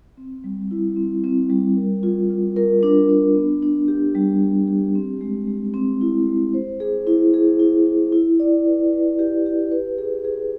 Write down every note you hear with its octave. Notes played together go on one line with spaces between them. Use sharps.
C4
G3
E4
C4
C4
G3
A#4
F4
F4
A#4
D4
D4
B3
D4
G4
G3
G4
G4
C4
G#3
G#3
C4
E4
G#3
C5
G#4
E4
G#4
E4
E4
E4
D5
B4
B4
G4
G4
B4
G#4
G#4